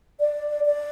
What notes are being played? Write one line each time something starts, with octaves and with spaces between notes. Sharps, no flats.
D5
D5